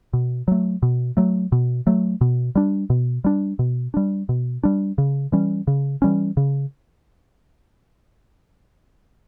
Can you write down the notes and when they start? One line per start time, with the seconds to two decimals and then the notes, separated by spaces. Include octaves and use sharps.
0.13 B2
0.48 F#3 A3
0.83 B2
1.17 F#3 A3
1.52 B2
1.87 F#3 A3
2.21 B2
2.55 G3 D4
2.90 B2
3.24 G3 D4
3.59 B2
3.94 G3 D4
4.29 B2
4.63 G3 D4
4.98 C#3
5.32 E3 G3 C#4
5.67 C#3
6.02 E3 G3 C#4
6.37 C#3